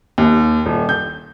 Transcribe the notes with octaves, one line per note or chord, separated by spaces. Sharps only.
D#2
D#1
G6